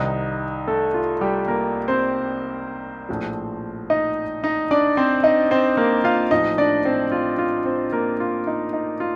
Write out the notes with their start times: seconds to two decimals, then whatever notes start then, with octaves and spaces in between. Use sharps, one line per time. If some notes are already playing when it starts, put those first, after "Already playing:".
Already playing: C2 C3 D#3 D#4
0.68 A3 A4
0.94 F4
1.21 G3 G4
1.48 A#3 A#4
1.88 C4 C5
3.09 A#1 A2 F3
3.90 D#4 D#5
4.44 D#4 D#5
4.71 D4 D5
4.97 C4 C5
5.24 D#4 D#5
5.51 C4 C5
5.77 A#3 A#4
6.04 F4 F5
6.31 A1 A2 F3 D#4 D#5
6.58 D4 D5
6.85 C4 C5
7.12 F4
7.39 F4
7.65 C4 C5
7.92 A#3 A#4
8.20 F4
8.47 D#4
8.73 D#4
9.00 F4